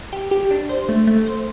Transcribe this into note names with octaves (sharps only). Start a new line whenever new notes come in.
G4
G4
D4
C5
A3
A3
C5